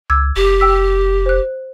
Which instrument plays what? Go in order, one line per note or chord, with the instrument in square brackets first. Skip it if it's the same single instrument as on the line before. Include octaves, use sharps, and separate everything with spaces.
[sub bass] C#2 [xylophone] D6 E6 G#6
[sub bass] F1 [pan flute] G4
[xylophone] G5 E6 B6
C5 F#6